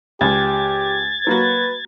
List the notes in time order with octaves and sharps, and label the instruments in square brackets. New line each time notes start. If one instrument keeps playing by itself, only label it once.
[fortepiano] C#2 [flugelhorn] G4 [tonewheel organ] G#6 A6
[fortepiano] F#3 A#3 F#4 [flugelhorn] B4